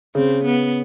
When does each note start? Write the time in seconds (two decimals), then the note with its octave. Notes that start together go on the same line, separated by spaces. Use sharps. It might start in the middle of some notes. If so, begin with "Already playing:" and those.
0.15 C#3 C4
0.45 B3